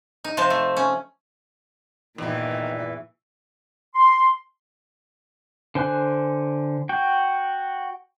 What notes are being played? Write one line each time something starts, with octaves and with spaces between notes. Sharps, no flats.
D#4
C3 F3 C5 A5
A3
C#4
E2 A#2 D#3 E3
C6
D3 C5 G#5 F#6
F#4 G5